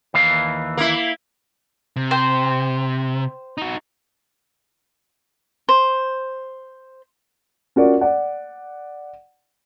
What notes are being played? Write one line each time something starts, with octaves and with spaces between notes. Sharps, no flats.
D#2 E3 F5
A#3 E4
C3
C5 G5
D#4 F#4
C5
C#4 F4 F#4 A#4 D5
D5 F#5